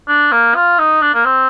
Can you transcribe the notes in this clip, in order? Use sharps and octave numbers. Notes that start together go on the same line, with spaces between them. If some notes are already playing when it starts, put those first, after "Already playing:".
D4
A#3
F4
D#4
D4
A#3
C4